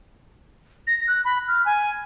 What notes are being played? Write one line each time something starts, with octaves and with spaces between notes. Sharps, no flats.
A#6
F#6
B5
F6
G#5